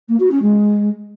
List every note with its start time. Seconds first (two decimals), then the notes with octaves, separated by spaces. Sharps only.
0.08 A#3
0.20 F#4
0.31 C#4
0.42 G#3